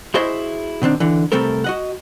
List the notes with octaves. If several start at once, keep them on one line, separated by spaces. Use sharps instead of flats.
E4 F#4 G#4 C5 D#5 E5
B2 D#3 C4 D4
D3 E3
C3 G3 A3 C4 A4 A#4
F#4 D#5 F#5